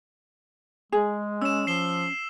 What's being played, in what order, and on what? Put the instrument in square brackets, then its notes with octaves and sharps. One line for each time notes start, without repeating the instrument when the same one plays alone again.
[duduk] G#3 [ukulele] G#4
[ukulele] C#4 [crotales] E6 E7
[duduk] F3 [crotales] C7 E7 G7